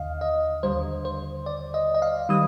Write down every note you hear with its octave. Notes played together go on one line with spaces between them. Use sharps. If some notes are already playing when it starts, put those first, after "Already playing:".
Already playing: D#2 D3 D#5 F5
D#5
D#2 D3 G3 C5
C5
D5
D#5
D#5
F5
D#3 G3 D#6